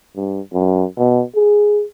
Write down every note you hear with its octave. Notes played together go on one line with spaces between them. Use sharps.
G2
F#2
B2
G#4